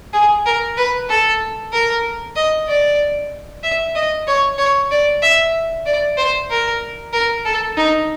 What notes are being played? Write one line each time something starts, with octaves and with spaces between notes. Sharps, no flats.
G#4
A#4
B4
A4
A#4
D#5
D5
E5
D#5
C#5
C#5
D5
E5
D5
C5
A#4
A#4
A4
D#4